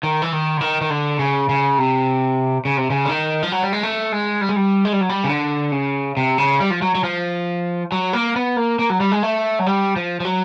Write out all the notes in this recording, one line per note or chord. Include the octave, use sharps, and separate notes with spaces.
D#3
E3
D#3
D3
D#3
D#3
D3
C#3
C#3
C3
C#3
C3
C#3
D3
D#3
F3
F#3
G3
G#3
A3
G#3
G3
G#3
G3
G#3
G3
F#3
G3
C#3
D3
C#3
C3
C#3
G3
F3
F#3
F#3
F3
F#3
A#3
B3
A#3
A#3
F#3
G3
G#3
A3
F#3
G3
F3
F3
F#3